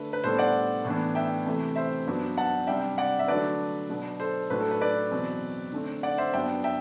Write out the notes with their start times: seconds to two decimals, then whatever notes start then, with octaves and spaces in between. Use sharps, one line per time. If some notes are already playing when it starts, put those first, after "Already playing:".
Already playing: D3 A3 B4
0.13 B4
0.24 A2 G3 B3 D4 A4 C5
0.39 D5 F#5
0.85 A2 E3 B3 D4
1.15 E5 G5
1.46 C3 E3 A3
1.76 C5 E5
2.06 G2 F#3 B3 D4
2.38 F#5 A5
2.67 C3 G3 D4 E5 G5
2.98 D5 F#5
3.19 E5
3.28 D3 F#3 A3 D4 B4 D5
3.90 B2 F#3 B3 D4
4.20 A4 C5
4.50 A2 F#3 A3 D4 B4
4.60 A4
4.71 B4
4.81 B4 D5
5.11 E2 B2 F#3 C4
5.72 D3 A3 C4
6.03 D5 F#5
6.18 C5 E5
6.33 G2 F#3 B3 D4 E5 G5
6.64 E5 G5